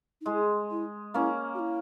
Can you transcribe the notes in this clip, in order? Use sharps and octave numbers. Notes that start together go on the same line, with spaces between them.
D#4
G#3 E4
E4
A#3 C#4 E4
F#4
E4